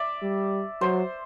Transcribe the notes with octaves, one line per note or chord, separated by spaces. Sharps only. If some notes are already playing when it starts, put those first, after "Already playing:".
Already playing: D5 E5
G3
F#3 C5